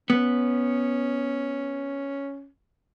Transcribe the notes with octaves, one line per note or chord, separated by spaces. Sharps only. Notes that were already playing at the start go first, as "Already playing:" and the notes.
B3 C#4